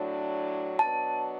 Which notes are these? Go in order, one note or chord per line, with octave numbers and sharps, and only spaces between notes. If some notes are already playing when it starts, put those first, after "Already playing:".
Already playing: A2 F#3 D4
B2 F#3 B3 D4 A5